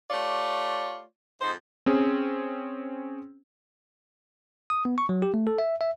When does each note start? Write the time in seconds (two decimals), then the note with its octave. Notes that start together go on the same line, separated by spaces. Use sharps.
0.11 A3 F4 G4 C#5 D5
1.41 F2 G#2 D#4 C5
1.86 C4 C#4 G#4
4.70 D#6
4.85 B3
4.98 C#6
5.09 F#3
5.22 G4
5.34 A3
5.47 A4
5.59 E5
5.81 E5